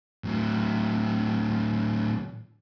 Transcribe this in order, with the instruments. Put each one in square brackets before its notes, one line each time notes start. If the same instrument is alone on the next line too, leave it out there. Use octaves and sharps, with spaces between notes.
[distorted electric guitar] A2 F#3